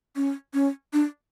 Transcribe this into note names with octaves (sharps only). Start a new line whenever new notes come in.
C#4
C#4
D4